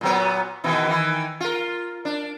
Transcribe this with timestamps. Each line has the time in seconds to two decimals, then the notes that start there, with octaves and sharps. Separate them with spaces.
0.01 A#2 F#3 B3
0.64 B2 D#3 E3
0.87 D#3 E3
1.40 F4 A#4
2.05 D4